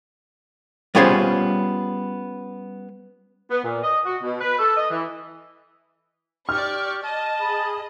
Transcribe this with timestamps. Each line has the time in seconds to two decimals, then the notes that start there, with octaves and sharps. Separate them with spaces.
0.95 G3 B3 C#4 F4 G#4 C5
3.51 B3
3.63 A#2
3.84 D#5
4.05 F#4
4.22 B2
4.41 B4
4.59 A4
4.77 D#5
4.90 E3
6.49 G4 D5 C#6 F6
7.04 D#5 A5
7.40 G#4 B5